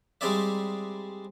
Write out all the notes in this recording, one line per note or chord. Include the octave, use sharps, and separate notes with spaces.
G3 G#3 C4 D#4 D5 E5